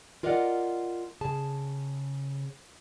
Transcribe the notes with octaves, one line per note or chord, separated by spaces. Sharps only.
F4 A#4 D5 D#5 F5 F#5
C#3 G#4 A5